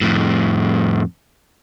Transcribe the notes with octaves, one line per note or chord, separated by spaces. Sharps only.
F2 A2